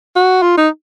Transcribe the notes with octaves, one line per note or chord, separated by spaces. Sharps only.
F#4
F4
D#4